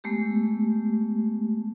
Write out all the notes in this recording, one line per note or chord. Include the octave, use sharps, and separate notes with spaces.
G#3 A3 B3 G4